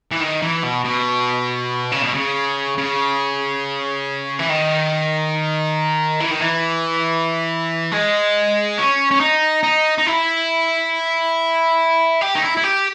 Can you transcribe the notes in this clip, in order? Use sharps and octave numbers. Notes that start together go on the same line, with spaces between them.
E3
D#3
E3
B2
B2
C#3
B2
C#3
C#3
E3
D#3
E3
D#3
E3
G#3
C#4
C#4
D#4
D#4
D#4
E4
G4
D#4
E4
E4
G4